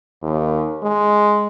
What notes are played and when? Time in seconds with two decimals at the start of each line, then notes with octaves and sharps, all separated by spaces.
0.23 D#2
0.83 G#3